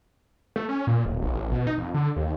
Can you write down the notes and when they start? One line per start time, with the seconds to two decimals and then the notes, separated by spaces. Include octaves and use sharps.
0.56 A3
0.69 C#4
0.87 A#2
1.05 D1
1.22 B1
1.34 A1
1.52 B2
1.67 D#4
1.78 F2
1.94 D3
2.16 D#2